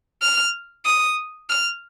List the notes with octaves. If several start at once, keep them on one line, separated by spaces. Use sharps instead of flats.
F6
D#6
F6